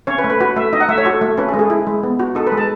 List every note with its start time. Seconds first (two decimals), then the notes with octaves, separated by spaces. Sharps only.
0.07 C#4 C#5
0.18 B4
0.24 A3
0.30 B4
0.40 F#4 B4
0.56 A3 E5
0.73 D#4 D#5
0.80 F#5
0.89 A3 E5
0.98 C#5
1.05 F#4 A4
1.21 A3
1.38 C#4 B4
1.49 A4
1.54 G#3
1.59 G#4
1.70 E4
1.87 G#3
2.03 B3
2.19 F#4
2.35 D#4 A4
2.47 B4
2.52 G#3
2.58 A5